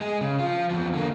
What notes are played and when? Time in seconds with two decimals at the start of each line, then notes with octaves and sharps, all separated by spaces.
0.01 G#3 G#4
0.21 C#3
0.40 F3 F4
0.71 E2 F3
0.94 D3 A#3